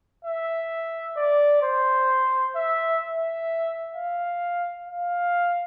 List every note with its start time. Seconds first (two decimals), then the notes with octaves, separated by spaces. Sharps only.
0.25 E5
1.16 D5
1.63 C5
2.56 E5
3.03 E5
3.95 F5
4.88 F5